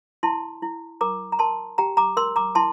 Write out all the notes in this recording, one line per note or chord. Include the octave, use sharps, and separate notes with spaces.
E4 A5 C6
E4
A#4 A#5 D6
A#5
A#4 A5 C6
G4 G5 A#5
A#5 D6
A#4 C6 E6
A#5 D6
E4 A5 C6